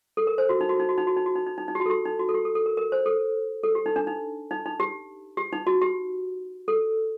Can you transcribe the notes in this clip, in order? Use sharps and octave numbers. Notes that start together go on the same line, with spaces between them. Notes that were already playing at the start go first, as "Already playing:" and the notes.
A4
A#4
C5
F#4
D#4
F#4
D#4
F#4
D#4
F#4
D#4
F#4
D#4
D#4
D#4
D#4
G4
F#4
A4
G4
D#4
F#4
A4
G4
A4
A4
A#4
A#4
C5
A4
A4
G4
D#4
D4
D#4
D#4
D#4
G4
G4
D#4
F#4
G4
A4